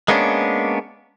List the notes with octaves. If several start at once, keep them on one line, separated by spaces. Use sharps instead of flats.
G#3 A#3 B3 C#4 D4